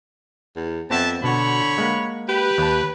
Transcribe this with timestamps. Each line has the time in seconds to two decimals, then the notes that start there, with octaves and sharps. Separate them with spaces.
0.56 E2
0.90 F2 B3 C4 E5 F#5 A5
1.23 B2 D3 F#4 C#5 B5
1.78 G#3 A#3 F#5
2.29 G4 B4
2.58 D#2 A5